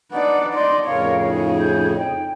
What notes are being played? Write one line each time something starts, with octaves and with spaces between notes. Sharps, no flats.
D4 D#4 B4 D5 F#5
D5 D#5 C6
F2 A2 C#3 A#4 C#5 F5
D#4 G#4
G6
G5